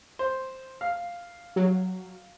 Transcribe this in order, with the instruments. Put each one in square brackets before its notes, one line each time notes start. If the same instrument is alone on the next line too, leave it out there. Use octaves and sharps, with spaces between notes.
[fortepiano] C5
F5
[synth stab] F#3